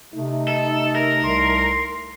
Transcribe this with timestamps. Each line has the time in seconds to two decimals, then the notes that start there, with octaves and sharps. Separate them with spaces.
0.13 C3 A3 D#4
0.48 A4
0.95 A#4
1.24 C2 C6